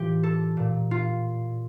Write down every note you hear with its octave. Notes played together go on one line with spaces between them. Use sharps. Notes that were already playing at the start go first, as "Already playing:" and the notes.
Already playing: A2 E3 F4 G4
A4
A#2
F4